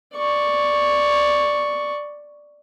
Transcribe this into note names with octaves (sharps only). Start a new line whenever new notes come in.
D5 C#6